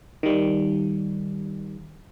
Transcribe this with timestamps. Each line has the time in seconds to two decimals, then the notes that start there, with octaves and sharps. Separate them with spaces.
0.23 D#3 G3